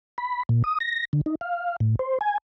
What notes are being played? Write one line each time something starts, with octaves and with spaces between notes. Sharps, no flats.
B5
A#2
D#6
A#6
D3
D#4
F5
A2
C5
G#5